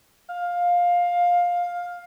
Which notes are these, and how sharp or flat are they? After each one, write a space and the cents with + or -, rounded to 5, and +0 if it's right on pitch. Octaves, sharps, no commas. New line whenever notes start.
F5 +15